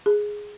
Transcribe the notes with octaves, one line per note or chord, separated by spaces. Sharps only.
G#4